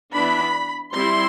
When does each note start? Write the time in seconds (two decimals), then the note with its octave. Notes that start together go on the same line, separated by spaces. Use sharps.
0.15 E3 B3 D4 B5
0.93 G3 C4 E4 C6